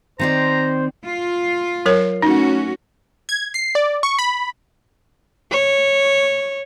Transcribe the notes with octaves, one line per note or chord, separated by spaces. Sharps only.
D#3 C4 C5 D5 A#5
F4
F#3 A#4 C#5
A3 C#4 D#4 F#4
G#6
C7
D5
C#6
B5
C#5